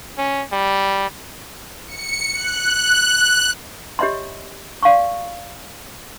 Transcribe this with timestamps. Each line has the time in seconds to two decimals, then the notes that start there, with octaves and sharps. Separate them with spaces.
0.18 C#4
0.53 G3
1.87 C#7
2.34 F#6
3.99 G4 C#5 D#5 E5 B5 C6
4.83 D5 F5 C6 C#6